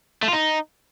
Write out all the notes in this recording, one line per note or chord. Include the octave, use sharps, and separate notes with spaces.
A3
F4
D#4